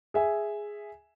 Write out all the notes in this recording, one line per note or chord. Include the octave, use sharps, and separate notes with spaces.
G#4 E5 G#5